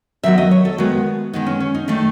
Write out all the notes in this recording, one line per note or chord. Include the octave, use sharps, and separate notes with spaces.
D#3 F#3 B3 E5
D#5
C#5
A4
D#3 G#3 B3 F#4
D#3 G#3 B3 D#4
C#4
C#4
D#4
D#3 A3 D#4